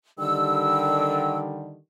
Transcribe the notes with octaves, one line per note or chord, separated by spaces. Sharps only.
D3 D#3 G3 E6